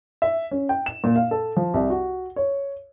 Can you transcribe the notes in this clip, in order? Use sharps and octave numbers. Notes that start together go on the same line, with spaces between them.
E5
C#4
G5
E7
A#2
F5
A4
F3
C2
F#4
C#5